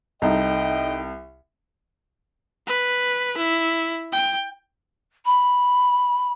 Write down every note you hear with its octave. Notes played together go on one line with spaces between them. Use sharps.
C2 D#4 A4 D#5 G5
B4
E4
G5
B5